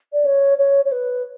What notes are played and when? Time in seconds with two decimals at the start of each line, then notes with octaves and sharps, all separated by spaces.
0.13 D5
0.25 C#5
0.58 C#5
0.85 C#5
0.92 B4